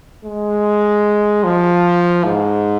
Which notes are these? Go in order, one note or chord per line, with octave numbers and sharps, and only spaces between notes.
G#3
F3
G#2